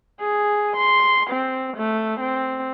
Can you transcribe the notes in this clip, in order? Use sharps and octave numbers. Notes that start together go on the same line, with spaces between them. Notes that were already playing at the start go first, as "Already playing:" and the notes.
G#4
C6
C4
A3
C4